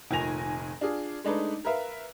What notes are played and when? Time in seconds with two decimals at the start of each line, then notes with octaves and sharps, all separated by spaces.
0.11 F1 A#2 D#3 G#5 A#6 F7
0.81 D4 F4 G#4
1.24 G#3 A3 D4 D#4 B4
1.64 A#4 B4 E5 F5